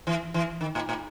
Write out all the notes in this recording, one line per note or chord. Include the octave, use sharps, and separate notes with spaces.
E3
E3
D#3
A2
A2